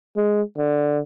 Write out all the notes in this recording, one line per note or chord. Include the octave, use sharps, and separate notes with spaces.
G#3
D3